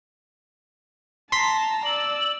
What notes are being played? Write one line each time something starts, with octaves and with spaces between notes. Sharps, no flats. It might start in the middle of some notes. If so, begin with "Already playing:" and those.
A5 A#5 C6 B6
D5 E6 F#7